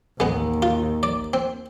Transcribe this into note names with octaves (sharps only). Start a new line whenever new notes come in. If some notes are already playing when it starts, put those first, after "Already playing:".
A1 D#2 G#3 B3
F4
D5
C4